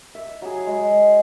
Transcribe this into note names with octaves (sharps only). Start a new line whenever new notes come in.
E5
F#3 G#4
G#3